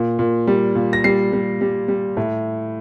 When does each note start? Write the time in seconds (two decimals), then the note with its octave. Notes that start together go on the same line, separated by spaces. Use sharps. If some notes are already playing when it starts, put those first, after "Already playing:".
Already playing: A#2
0.19 A#2
0.47 G3
0.75 A#2
0.93 A#6
1.04 G3 C7
1.33 G3
1.61 G3
1.88 G3
2.17 A2